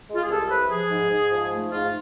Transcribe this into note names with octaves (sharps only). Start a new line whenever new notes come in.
G#3
F4
G#4
C2 A4
C3 B4
F3 G#4
G#2
G#2
F3
A3
G#2 F4